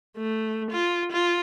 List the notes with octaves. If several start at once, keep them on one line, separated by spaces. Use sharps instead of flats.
A3
F4
F4